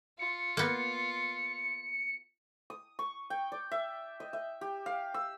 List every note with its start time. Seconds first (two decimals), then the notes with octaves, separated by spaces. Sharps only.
0.19 F4 C#7
0.57 A#3 B3
2.70 D#6
2.99 C#6
3.30 G5
3.52 D5
3.71 E5
4.20 D#5
4.33 E5
4.61 G4
4.86 F5
5.14 E6